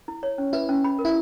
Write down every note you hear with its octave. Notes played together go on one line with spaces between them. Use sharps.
E4
C#5
C#4
E4 B4
C#4
B5
A#4
E4